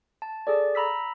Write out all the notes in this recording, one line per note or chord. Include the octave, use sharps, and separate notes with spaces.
A5
G#4 A4 D5
A#5 B5 E6 B6